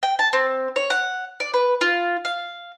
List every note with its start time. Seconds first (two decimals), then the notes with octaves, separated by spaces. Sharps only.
0.03 G5
0.19 A5
0.33 C4
0.76 C#5
0.90 F#5
1.40 D5
1.54 B4
1.81 F4
2.25 F5